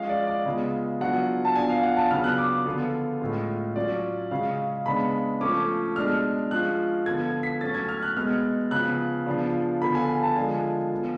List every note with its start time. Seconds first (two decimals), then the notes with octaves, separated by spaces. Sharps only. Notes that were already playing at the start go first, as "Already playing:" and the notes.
Already playing: F3 G#3 C#4 F4 F5
0.09 D5
0.27 D5
0.45 C#3 G#3 B3 F4
1.01 F#3 B3 D4 F4 F#5
1.45 A5
1.55 F3 B3 D4 F4 G#5
1.69 F5
1.83 F#5
1.97 A5
2.11 C#3 F#3 B3 D4 F6
2.24 F#6
2.38 D6
2.65 D3 F3 B3 F4
3.21 A2 G#3 C#4 F4
3.76 F#3 C#4 F4 D5
4.31 C#3 G#3 C#4 F5
4.86 C#3 G#3 B3 D4 B5
5.41 F3 A3 C#4 D6
5.96 B2 G#3 D4 F6
6.51 F3 G#3 C#4 F4 F#6
7.06 D3 F3 B3 F4 G#6
7.43 B6
7.61 F#3 A3 C#4 A6
7.75 G#6
7.89 F6
8.03 F#6
8.16 B2 G#3 B3 F6
8.71 C#3 F3 B3 F#6
9.26 C#3 F3 B3 D4 F4
9.82 D3 F3 B3 F4 B5
9.95 G#5
10.09 G#5
10.23 A5
10.36 D3 F3 G#3 D4 F4 G#5
10.92 F3 B3 F4